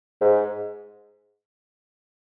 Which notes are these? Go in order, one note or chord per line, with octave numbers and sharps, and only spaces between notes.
G#2